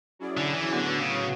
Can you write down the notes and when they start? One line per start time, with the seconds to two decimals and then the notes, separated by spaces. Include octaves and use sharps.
0.19 F#3 C#4 E4 G#4 D5
0.37 D3
0.54 E3
0.73 A2 D3 F#3 B3 F#4 C#5
0.99 C#3